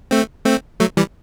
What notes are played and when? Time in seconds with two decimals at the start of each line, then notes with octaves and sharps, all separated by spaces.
0.11 A3 C4
0.45 A3 C4
0.80 F#3 A3
0.97 E3 G3